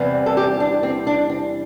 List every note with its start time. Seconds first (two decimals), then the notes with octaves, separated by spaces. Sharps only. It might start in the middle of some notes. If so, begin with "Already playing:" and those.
Already playing: E2 C3 E3 G3 C4
0.26 A4
0.37 G4
0.60 D4
0.83 C4
1.07 D4
1.30 C4